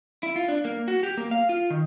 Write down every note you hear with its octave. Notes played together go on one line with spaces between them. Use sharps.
E4
F4
D4
A#3
F#4
G4
A#3
F5
F4
D#3